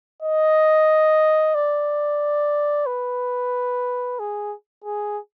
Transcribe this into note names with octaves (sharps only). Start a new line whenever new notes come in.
D#5
D5
B4
G#4
G#4